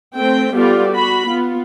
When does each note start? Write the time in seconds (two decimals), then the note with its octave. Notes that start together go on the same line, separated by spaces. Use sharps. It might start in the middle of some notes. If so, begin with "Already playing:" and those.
0.15 A3 C4 G5
0.54 G3 B3 F4 G4 A4 D5
0.91 F#4 B5
1.26 B3 F4